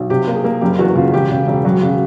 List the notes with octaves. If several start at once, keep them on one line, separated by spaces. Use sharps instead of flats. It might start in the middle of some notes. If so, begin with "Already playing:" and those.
Already playing: B1
C3 G4
A#3
G#4
A#3
F#1 G4
E2 F#4
C#3 F4
E1 G4
C#3
E1
F#3
C#3